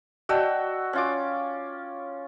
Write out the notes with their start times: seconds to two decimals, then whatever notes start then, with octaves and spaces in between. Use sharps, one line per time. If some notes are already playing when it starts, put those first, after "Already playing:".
0.29 F#4 D5 D#5 G5 A5 E6
0.93 C#4 F4 D6